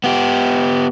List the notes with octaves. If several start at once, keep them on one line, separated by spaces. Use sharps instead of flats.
B3 G4